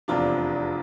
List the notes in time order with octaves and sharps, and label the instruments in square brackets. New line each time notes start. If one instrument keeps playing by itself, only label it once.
[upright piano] F1 E2 C3 [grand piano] D4 F4